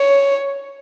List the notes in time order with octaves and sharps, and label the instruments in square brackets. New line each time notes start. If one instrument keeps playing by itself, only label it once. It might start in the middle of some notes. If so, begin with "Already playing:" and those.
Already playing: [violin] C#5